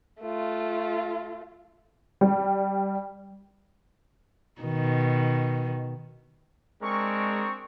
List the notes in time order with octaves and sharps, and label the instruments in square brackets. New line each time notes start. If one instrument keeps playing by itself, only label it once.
[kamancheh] A3 F4
[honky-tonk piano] G3
[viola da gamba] B2 D#3
[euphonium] G#3 [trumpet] C4 [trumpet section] D4 G#4 A#4 [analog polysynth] C#6